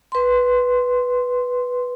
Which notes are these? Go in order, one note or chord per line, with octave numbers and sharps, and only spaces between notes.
B4 C6